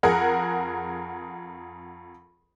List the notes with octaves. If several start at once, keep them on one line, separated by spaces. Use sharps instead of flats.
F2 G#4 A#4 F#5